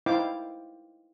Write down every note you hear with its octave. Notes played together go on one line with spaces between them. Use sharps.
D#4 E4 C5 F5 G5 D6